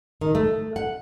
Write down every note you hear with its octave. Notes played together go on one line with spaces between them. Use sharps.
D#3
A3
F#5